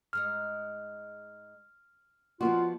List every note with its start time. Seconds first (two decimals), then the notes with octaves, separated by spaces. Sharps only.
0.13 G#2 G#3 D#4 F6
2.41 F3 B3 F4 F#4 D5